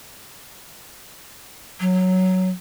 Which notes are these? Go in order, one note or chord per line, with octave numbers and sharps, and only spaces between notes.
F#3